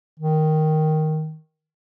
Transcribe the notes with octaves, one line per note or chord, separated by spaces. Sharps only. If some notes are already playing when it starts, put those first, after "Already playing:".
D#3